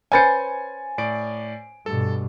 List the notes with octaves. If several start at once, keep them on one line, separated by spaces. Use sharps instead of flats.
C#4 B4 C5 G#5 A6 C#7
A2 D5 D7
G2 B2 A4